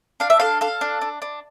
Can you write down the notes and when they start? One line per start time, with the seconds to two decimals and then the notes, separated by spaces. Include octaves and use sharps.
0.20 D4 F5
0.30 E5
0.40 A4 F5
0.61 A4 F5
0.81 D4
1.01 D4
1.22 D4